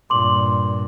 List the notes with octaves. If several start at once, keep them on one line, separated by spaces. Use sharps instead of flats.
G2 A#2 C6 D6 F#7